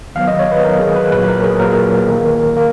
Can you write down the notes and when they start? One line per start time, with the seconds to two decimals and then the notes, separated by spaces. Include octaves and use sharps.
0.15 D#3 F#3 B3 F5
0.27 D#5
0.39 C#5
0.52 B4
0.64 D#3 F#3 B3 A#4
0.80 G#4
0.96 B4
1.12 A#2 F#3 A#3 B4
1.28 A#4
1.44 G#4
1.60 A#2 F#3 A#3 A#4
2.08 D#3 A#3
2.56 A#3